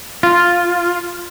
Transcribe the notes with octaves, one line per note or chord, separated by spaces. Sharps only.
F4